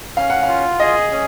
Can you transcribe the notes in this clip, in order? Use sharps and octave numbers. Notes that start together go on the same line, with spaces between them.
C#4 F5
F#5
F5
F4
G#4 D#5
C#4